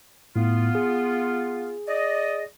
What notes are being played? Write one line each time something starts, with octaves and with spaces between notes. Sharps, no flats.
A2 B3 F4
G#4
D5 D#5